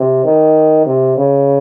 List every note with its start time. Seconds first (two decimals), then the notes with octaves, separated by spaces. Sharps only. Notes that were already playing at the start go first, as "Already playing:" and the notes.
Already playing: C3
0.25 D#3
0.86 C3
1.17 C#3